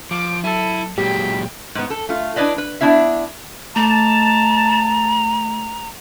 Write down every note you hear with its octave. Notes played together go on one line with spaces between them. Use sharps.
F3 D6 D7
F#3 E4 A4 D#7
A#2 F#3 G#3 G4 G5 B6
G#2 B3
A4
A3 F4
D4 E4 B4 D5 D#5
B4
B3 D4 E4 E5
A3 A5 A#5